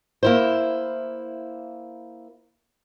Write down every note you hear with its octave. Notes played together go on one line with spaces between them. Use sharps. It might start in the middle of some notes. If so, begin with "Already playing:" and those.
A#3 E4 C5